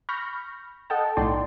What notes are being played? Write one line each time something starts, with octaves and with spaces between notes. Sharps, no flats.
B5 C#6 F6 G6 A#6
A4 D#5 F#5 G5 A5
B1 A2 D#4 D5 G5 C6